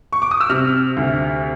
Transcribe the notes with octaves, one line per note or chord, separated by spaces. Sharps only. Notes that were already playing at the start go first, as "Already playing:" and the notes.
C#6
D6
D#6
E6
C3 F6
D2